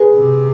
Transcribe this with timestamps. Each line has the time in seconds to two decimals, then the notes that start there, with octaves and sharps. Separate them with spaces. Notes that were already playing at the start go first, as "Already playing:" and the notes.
Already playing: G#4 B4
0.15 C3